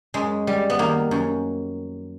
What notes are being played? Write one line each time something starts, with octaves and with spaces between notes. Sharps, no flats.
F#2 G#3
G3
B3
D#3 A#3
F#2